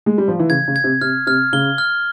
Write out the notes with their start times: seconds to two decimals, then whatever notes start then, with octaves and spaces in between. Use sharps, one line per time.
0.06 G#3
0.18 G3
0.28 F3
0.39 E3
0.50 C#3 G#6
0.68 C#3
0.76 G#6
0.84 C3
1.01 C3 F6
1.27 C3 F6
1.53 C#3 G7
1.78 F6